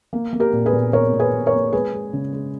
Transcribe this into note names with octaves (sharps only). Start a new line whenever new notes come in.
A#3
A#3
G4 A#4
A#2
G#4 B4
A#2
A#2 A#4 C#5
A#2
G#4 B4
A#3
A#4 C#5
A#3
G#3 G#4 B4
G#3
C#3
G#3